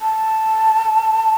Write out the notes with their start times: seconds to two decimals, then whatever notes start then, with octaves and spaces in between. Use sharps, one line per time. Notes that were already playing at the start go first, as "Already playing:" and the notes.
0.01 A5